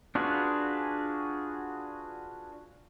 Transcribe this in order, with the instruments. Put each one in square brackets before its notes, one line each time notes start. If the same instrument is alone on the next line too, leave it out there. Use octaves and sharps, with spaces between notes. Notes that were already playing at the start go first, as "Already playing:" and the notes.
[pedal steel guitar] D4 F4 F#4 G#4 B4